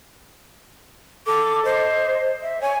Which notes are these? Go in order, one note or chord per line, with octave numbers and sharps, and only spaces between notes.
A4 D6
C5 D#5
E5
C#5 G#5